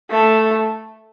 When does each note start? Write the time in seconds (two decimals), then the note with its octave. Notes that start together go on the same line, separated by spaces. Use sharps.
0.10 A3